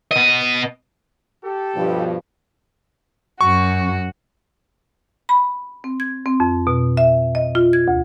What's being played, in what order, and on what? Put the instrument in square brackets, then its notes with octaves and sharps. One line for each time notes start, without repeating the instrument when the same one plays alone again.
[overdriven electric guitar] B2 D#5
[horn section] G4 A4
[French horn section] G2 B2 F3
[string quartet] F#2 F#4 [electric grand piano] C#6
[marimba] B5
C4
G#6
C4
F2
B2
E5
D#5
F4
G#6
D2